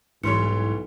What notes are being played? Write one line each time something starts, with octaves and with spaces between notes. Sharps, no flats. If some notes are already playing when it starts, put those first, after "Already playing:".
B1 G#2 E3 G3 C#5 C6 C#7